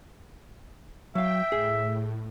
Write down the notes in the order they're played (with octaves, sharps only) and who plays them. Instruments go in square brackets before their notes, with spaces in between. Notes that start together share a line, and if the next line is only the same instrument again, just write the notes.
[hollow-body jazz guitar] F#3 F5 [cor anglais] E5 [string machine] G5
[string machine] A2 [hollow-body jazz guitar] G#4